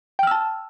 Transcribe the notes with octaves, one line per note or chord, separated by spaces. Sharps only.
G5 A5 E6 F6